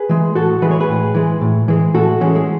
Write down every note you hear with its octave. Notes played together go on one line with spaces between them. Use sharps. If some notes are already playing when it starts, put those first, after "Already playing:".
Already playing: G#4 B4
E3 G#3
A2 F#4 A4
E3 G#3 B4
C#5
G#4 B4
A2
E3 G#3
A2
E3 G#3
A2 F#4 A4
E3 G#3 A3 C#4
G#3